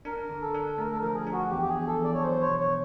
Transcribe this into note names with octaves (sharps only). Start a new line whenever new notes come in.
D4 A#4
D3
A4
D4
A3 A#4
A4
A#4
F3
G#4
D4
F#4
E2 G4
G4
G#4
E2
A4
E2 D5
C#5
F#3 C5
C#5
B2
C#5